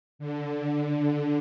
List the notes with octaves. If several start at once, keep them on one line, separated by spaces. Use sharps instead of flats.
D3